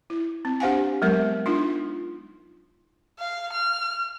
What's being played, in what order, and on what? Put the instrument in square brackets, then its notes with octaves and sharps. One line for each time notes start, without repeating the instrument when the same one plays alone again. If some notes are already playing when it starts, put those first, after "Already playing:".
[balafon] E4
C4
D4 G4 C5 F5 F#5 G#5
F#3 G#3 B3 A#4
D4 D#4 F4
[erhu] F5
F6